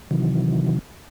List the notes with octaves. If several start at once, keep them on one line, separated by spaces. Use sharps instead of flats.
C3 D#3 E3 F#3